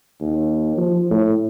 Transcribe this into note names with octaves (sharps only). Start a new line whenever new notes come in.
D#2
F3
A2